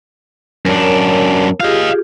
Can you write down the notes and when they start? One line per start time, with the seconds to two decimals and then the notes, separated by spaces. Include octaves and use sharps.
0.66 F#2 D4 A#4 C#5
1.60 F4 G4 G#4 D#5 F5